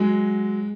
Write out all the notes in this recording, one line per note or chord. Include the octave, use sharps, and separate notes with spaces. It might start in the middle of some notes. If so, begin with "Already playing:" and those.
Already playing: F#3 G#3